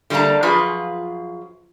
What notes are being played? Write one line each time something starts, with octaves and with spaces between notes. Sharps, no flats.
D3 G3 A3 A#3 A5 A#5
F#2 F3 F4 G#4 B4